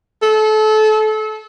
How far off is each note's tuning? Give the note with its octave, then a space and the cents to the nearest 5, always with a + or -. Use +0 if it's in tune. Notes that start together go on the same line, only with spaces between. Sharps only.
A4 -30